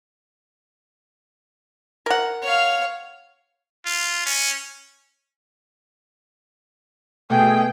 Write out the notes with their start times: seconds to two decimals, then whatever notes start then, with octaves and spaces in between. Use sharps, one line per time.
2.06 A#4 F#5
2.43 C#5 F5
3.85 F4
4.26 C#4
7.30 B2 A3 G#4 G5